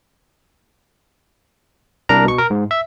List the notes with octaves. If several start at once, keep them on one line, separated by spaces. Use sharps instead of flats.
C2 D4 A#4 A#5
B2 C#6
A#4
G#2
E5